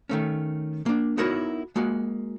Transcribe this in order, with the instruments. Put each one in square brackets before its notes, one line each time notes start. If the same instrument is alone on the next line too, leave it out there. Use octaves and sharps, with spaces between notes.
[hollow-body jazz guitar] D#3 A3 C#4
A#3 D4
B3 D#4 E4 F#4 A#4 C#5
G#3 A#3 F#4